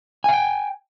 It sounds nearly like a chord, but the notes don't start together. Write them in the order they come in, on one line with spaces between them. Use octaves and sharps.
G#5 F5 G5